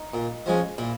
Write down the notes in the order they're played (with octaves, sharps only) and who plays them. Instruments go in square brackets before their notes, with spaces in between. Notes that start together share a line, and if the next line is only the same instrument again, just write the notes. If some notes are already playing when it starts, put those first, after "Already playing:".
Already playing: [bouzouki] D#4
[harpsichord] A#2
F3 G#3 C#4
[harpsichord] A#2 [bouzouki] E4